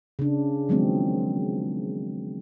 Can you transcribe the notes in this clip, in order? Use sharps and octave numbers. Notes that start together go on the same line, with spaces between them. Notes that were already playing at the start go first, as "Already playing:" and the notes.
C#3 D4
D#3 F3 F#3 G#3 B3 C4